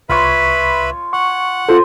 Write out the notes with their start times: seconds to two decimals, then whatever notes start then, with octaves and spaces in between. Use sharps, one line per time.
0.09 C2 F4 B4 C#5 E5 B5 C#6
1.13 F#5 C#6
1.69 F4 A4 C5